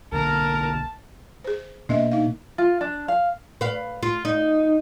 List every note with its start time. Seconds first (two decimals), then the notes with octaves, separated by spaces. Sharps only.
0.13 B1 D3 A#3 A#4 A5
1.44 G#4 C5
1.89 B2 A#3 D4 D#5 E5
2.12 D#4 F5
2.58 F4
2.81 D4
3.08 F5
3.61 B4 F5
4.03 F4
4.25 D#4